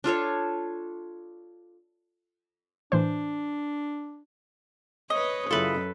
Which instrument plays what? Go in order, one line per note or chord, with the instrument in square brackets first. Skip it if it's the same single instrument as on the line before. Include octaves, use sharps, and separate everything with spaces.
[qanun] D4 F4 A4 C#5
[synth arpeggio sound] A2 E3 C5 [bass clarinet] D4
[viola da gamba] B4 C#5 [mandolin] D#5
[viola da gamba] F#2 [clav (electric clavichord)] C#3 E4 F4 [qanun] A4 B4